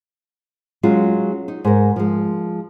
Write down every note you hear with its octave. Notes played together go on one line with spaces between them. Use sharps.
F#3 G#3 C#4 F4
D#4
G#2 A#4
F3 G#3